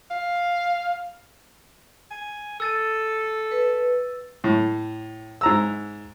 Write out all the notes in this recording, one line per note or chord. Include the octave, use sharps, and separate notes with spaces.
F5
G#5
A4 E6 A6 D#7
B4
A2
G#2 A#5 E6